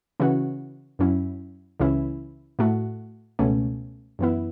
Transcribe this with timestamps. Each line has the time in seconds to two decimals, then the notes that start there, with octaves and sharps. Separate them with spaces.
0.20 C#3 E3 C#4 F#4
0.99 F#2 F#3 C#4 E4
1.80 C#2 C#3 E3 C#4 E4
2.59 A2 A3 F#4
3.39 C#2 B2 A3 C#4
4.19 F#2 E3 B3 E4